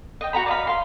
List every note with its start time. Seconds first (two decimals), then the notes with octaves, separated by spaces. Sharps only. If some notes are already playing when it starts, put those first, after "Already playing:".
0.21 D#5 G5
0.33 F#4 F#5 A#5 B5
0.46 D5 D#5 F5 B5
0.67 F5 C6